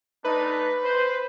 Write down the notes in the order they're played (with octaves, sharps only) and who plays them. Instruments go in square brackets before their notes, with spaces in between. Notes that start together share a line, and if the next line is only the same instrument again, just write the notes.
[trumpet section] A3 D4 D#4 [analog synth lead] B4
[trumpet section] C5